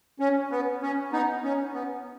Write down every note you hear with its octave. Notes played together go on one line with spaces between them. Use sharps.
C#4
B3
C#4
B3 D#4
C#4
B3